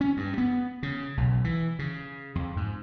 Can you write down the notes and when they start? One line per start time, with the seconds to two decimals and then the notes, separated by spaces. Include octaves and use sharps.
0.01 C#4
0.17 G2
0.38 B3
0.83 C#3
1.17 B1
1.44 E3
1.79 C#3
2.35 F2
2.57 G#2